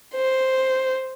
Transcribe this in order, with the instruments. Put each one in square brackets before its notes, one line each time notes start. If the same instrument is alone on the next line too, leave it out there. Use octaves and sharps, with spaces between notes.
[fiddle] C5